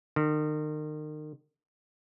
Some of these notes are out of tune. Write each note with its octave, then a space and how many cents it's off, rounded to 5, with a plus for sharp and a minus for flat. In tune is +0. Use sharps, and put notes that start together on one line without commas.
D#3 -35